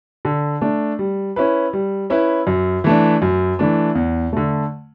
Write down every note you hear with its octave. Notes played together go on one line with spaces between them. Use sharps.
D3
A3 D4
G3
C#4 E4 B4
G3
C#4 E4 B4
F#2
E3 A3 D4
F#2
E3 A3 D4
E2
D3 A3